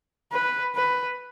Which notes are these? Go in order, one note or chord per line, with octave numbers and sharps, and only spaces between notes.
B4
B4